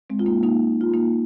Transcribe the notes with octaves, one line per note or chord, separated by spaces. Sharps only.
G#3 C4
F4
A#3 D#4
A#3 D#4
F4
A#3 D#4